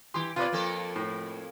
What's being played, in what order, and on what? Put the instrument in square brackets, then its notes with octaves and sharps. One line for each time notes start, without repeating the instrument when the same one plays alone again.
[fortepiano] E3 C6 [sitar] G4
[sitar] B2 [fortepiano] F4 B4 D5
[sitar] F2 A#3 A4
[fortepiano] A2